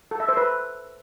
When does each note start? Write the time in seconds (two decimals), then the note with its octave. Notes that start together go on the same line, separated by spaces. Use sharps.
0.11 A4
0.20 E5
0.29 C5
0.37 B4